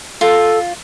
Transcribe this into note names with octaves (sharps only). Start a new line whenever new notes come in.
F4 A4